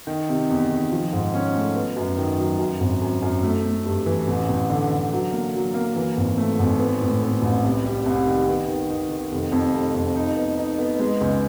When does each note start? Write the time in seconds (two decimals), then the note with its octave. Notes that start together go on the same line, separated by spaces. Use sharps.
0.07 D#3
0.29 C3
0.50 E2
0.70 D#3
0.91 F3
1.13 G#2
1.34 C#4
1.55 A3
1.76 B3
1.97 F#2
2.18 D#3
2.39 F#3
2.59 F#2
2.80 G#1
3.02 F#2
3.22 F#2
3.43 A3
3.65 A3
3.86 G2
4.06 E3
4.28 A1
4.49 A1
4.70 D3
4.91 D3
5.12 F#3
5.32 A#3
5.54 F#3
5.74 A#3
5.96 E3
6.17 G#1
6.38 A3
6.59 G#1
6.80 B3
7.01 A2
7.22 B3
7.42 A1
7.64 C2
7.84 G3
8.06 C2
8.26 D#3
8.48 B3
8.69 D#3
8.90 D#3
9.11 D#3
9.31 F1
9.52 F2
9.74 F1
9.94 F2
10.16 D#4
10.36 B3
10.57 D#4
10.79 B3
11.00 G#3
11.21 C#2